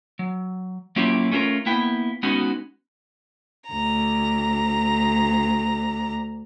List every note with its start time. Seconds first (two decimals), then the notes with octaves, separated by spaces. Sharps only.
0.19 F#3
0.96 F#3 A#3 C#4 E4 F4 G4
1.31 A3 C#4 F4 A4 A#4
1.66 A#3 B3 E4 G5
2.23 G#3 B3 C#4 D#4 F#4
3.69 D2 A#5